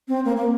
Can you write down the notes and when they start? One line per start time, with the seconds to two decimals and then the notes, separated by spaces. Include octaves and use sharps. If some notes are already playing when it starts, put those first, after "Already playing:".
0.08 C4
0.25 A#3
0.36 A#3